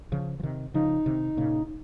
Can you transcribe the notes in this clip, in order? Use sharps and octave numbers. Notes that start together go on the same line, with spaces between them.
C#3 F3
F3
C3 D#3
C#3 F3 D#4
C3 D#3
A#2 C#3